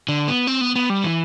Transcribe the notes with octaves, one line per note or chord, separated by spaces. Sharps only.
D3
B3
C4
B3
B3
G3
E3